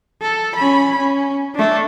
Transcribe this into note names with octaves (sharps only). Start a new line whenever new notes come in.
A4
C#4 B5
C#4
A3 D4